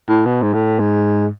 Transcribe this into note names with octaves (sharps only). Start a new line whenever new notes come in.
A2
B2
G#2
A2
G#2